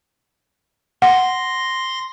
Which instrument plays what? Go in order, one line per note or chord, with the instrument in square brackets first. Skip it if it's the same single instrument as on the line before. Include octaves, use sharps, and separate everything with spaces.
[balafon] F#5 [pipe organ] C6 A#6